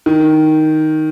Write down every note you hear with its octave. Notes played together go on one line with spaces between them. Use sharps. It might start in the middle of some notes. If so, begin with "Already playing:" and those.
D#3